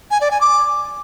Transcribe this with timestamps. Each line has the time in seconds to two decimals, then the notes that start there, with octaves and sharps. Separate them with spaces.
0.11 G#5
0.21 D5
0.31 G#5
0.41 D6